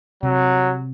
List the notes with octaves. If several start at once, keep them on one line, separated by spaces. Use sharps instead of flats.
C3 F#3